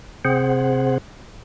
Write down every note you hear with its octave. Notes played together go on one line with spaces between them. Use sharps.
C3 C4 G#4 C5 F#5